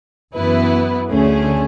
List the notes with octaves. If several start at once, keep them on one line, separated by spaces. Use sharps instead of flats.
F#2 E3 B3 E4 B4
D2 D3 A3 C#4 G#4